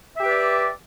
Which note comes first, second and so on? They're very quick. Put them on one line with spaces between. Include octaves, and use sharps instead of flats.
E5 G4 B4 D5